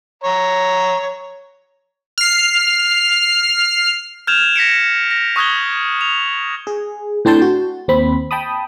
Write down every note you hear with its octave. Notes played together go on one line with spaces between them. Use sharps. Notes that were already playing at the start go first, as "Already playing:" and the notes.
C#5 A#5
F6 C7
F6 G6 G#6 E7 F7
A#6 B6 C#7 D7
A#6
C#6 D#6 F#6 G#6 G7
F7
G#4
A2 C4 D4 C5 A5 G6
F#4
D#2 C4 B5
G5 A5 B5 D#6